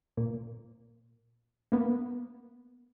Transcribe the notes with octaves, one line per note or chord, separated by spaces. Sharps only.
A#2
A#3 B3